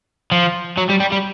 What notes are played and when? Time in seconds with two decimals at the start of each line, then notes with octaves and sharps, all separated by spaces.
0.32 F3
0.78 F#3
0.90 G3
1.00 G3
1.12 G3